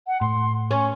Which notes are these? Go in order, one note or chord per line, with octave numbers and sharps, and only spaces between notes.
F#5
A2 C6
C#4 C#6